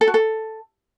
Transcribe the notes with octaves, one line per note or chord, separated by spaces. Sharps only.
A4
F#4
A4